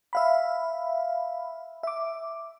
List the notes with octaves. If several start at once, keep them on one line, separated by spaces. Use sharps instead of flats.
E5 F5 B5
E5 D6